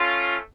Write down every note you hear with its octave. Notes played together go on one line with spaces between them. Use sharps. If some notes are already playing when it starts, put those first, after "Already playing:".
Already playing: A3 C#4 F4